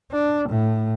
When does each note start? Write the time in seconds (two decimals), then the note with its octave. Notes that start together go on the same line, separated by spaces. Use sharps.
0.11 D4
0.49 A2